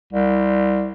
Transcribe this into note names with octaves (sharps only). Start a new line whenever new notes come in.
C2